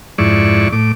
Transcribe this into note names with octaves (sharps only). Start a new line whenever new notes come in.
F2 G#2 E4 D5 C#6
A2 D6